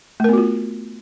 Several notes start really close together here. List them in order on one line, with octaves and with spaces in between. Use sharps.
A3 A#4 B3 F#4 F4